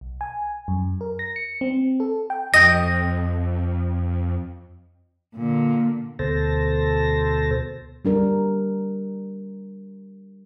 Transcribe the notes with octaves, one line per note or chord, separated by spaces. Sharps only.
B1
G#5
F#2
A#4
A#6
C#7
C4
A4
G5
F2 D#5 G5 A#6
A#2 D3
D2 B2 A4 C5 A5 A#6
G3 D4 A#4